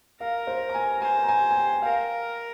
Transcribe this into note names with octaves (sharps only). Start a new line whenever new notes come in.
A#4 F5
C5
A#5
G#5
C5 G#5
A#5
G#5
G#5
G5
A#4 F5